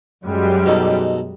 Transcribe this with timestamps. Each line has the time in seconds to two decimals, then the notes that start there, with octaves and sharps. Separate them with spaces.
0.23 F#2 G3 G#3
0.66 B2 D#4 A4